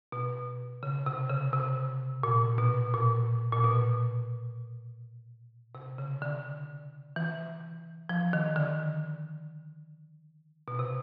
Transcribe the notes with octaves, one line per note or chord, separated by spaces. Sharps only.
B2
C#3
C3
C#3
C3
A#2
B2
A#2
A#2
B2
C3
C#3
D3
E3
F3
D#3
D3
B2
C3